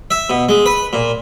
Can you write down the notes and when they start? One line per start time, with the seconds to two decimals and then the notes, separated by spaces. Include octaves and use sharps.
0.11 E5
0.30 B2
0.49 G#3
0.66 B4
0.93 A#2